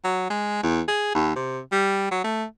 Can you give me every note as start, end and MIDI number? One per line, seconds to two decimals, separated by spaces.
0.04 0.26 54
0.30 0.63 56
0.63 0.81 40
0.88 1.11 68
1.15 1.34 39
1.36 1.59 48
1.72 2.10 55
2.11 2.23 54
2.24 2.44 57